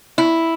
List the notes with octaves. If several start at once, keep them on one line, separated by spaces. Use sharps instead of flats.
E4